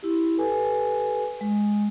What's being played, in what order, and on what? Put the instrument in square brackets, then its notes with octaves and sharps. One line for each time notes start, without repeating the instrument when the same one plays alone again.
[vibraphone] E4 G4
G4 A4 B4 G#5
G#3